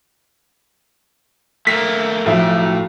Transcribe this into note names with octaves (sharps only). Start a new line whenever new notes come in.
A3 A#3 B6
B1 A2 F3 E5